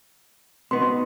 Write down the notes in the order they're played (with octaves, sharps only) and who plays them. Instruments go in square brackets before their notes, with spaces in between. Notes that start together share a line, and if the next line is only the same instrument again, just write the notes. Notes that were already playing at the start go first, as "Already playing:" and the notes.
[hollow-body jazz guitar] B2 B3 D#4 [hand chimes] C6